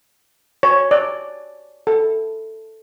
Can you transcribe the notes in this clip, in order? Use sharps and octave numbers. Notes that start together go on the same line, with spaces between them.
C#5
D5
A4